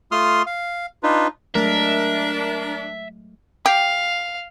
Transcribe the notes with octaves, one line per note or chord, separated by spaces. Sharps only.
A3 F4 C6 D#6 F6
F5
D4 D#4 F4 B4
F#3 G#3 A3 D4 A#4 E5
G4 F5